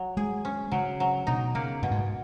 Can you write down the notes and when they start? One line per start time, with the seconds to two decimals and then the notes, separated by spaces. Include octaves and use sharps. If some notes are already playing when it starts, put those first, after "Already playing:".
Already playing: F#3
0.17 G#3 G#4
0.45 C#4
0.72 C#3 F#3
1.00 F#3
1.27 B2 D#4
1.55 C#3 A#3
1.82 F#2 B2
1.91 G#2